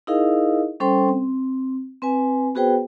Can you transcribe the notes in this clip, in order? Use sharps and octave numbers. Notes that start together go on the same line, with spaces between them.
D#4 E4 G#4 A#4 D#5 F5
G3 C#4 A4 C5 G5 C6
C4
C4 B4 G#5
B3 F#4 G#4 B4 C5 G5